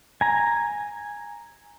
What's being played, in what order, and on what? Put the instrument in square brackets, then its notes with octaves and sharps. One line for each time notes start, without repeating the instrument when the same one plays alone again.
[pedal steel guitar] G#5 A#5